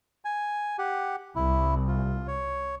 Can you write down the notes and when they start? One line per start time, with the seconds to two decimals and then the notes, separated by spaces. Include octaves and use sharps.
0.25 G#5
0.79 G4 F#5
1.35 C2 E4
1.88 F4
2.28 C#5